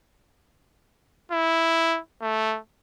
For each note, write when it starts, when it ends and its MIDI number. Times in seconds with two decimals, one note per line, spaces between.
1.31 1.99 64
2.22 2.58 57